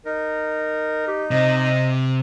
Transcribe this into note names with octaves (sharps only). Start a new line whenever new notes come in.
D#4 A#4
G4
C3 D#5